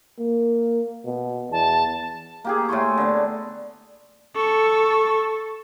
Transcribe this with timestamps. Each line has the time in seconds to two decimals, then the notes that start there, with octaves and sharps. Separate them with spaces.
0.19 A#3
1.06 B2
1.52 E2 A5
2.44 A#3 G4 G#4
2.69 A2 G#5 C6 C#6
2.97 D3 B3
4.36 A4 C#6